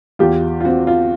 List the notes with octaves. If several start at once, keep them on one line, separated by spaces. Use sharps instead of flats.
E2 F4 G4
F4
C4 F#4
F4